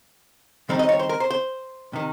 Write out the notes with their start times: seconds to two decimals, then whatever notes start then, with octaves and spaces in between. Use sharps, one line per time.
0.69 D#3 G3 C4 D#4
0.79 D#5
0.89 C#5
0.99 C5
1.09 A#4
1.20 C5
1.30 C5
1.93 C3 D#3